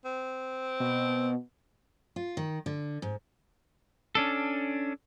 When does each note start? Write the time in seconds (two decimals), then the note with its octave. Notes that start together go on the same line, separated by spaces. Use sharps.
0.05 C4
0.80 B2
2.16 F4
2.37 D#3
2.66 D3
3.02 G#2
4.15 C#4 D4 A4